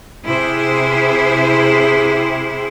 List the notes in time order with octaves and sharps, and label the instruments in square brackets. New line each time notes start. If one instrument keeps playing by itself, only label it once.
[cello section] C3 E4 G#4 C5